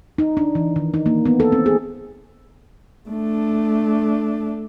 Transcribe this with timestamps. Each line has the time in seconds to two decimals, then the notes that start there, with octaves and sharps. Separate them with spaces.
0.18 D#4
0.37 D4
0.55 E3
0.76 D#3
0.94 D#4
1.06 A#3
1.26 B3
1.40 A4
1.52 C4
1.66 G#4
3.09 A3 D4